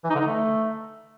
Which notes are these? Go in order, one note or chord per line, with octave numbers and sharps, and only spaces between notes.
E3
D#4
D3
D#4
A3